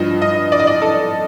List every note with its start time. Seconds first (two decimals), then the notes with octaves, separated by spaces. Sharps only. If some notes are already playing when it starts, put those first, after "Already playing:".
Already playing: G2 F3 D#5
0.22 D#5
0.52 D5
0.60 D#5
0.67 D5
0.82 A4